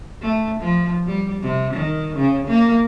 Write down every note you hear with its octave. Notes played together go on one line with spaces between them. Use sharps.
A3
F3
G3
C3
D#3
C#3
A#3